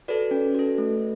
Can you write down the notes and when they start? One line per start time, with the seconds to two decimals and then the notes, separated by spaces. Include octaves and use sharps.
0.08 F#4 A4 B4 D5
0.31 C#4
0.54 F#4 A4
0.78 A3